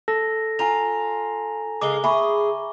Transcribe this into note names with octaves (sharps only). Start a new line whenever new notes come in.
A4 A#6
F4 G#5 A#5 F7
C#3 G#3 A#4 D6 G7
G#4 E5 B5 C#6